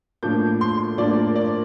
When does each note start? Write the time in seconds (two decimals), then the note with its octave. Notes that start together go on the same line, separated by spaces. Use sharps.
0.23 A2 F3 A#3 D4 G6
0.61 C6
0.98 A2 F3 A#3 D4 D5
1.16 A#4
1.36 D5